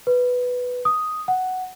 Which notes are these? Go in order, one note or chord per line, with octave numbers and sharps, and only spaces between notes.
B4
D#6
F#5